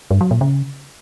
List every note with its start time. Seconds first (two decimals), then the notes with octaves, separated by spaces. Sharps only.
0.11 G2
0.21 F#3
0.31 A#2
0.41 C#3